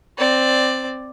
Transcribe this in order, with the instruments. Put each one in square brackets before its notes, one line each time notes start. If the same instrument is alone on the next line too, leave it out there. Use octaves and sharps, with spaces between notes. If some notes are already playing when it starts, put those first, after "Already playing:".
[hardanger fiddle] C4 D5